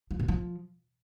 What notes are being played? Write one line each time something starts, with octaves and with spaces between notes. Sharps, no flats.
F3
B2
F3